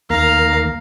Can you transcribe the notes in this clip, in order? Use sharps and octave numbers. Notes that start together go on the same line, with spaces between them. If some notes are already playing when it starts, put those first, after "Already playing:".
D#2 A#3 F5 A#5